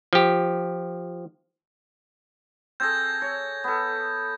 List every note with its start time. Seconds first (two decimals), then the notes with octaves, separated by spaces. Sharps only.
0.13 F3 G4
2.80 C4 G#4 A4 G6 G#6 A#6
3.22 C#5
3.64 B3 A4